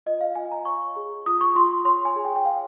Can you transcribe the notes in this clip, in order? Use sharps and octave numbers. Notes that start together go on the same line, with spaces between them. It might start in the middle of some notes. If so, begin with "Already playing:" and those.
F4 D#5
F5
F4 G#5
G#5
A#5
C#5 C#6
G#4
F4 D#6
C#6
F4 C6
C#5 C6
G#5
G#4
G5
G5
C#5 F5